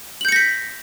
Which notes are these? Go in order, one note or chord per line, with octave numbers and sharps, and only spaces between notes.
G6 A#6 B6 C#7 F#7